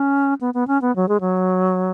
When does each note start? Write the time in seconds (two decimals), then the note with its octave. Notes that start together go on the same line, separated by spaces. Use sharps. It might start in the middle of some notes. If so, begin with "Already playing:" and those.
Already playing: C#4
0.41 B3
0.54 B3
0.68 C#4
0.82 B3
0.96 F#3
1.09 G#3
1.21 F#3